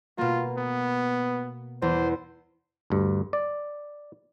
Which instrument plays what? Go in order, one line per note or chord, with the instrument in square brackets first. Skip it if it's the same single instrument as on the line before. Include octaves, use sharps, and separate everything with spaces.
[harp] B2 A#3 [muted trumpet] F4
[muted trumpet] B3
[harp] E2 [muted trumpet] C5
[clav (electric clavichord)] D2 G2
D5